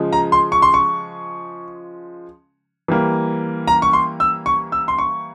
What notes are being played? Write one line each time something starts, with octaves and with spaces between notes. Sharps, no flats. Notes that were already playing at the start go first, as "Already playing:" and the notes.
Already playing: C#3 F3 G#3
A#5
C6
C#6
C6
C#6
E3 G3 A#3
A#5
C#6
C6
E6
C#6
E6
C6
C#6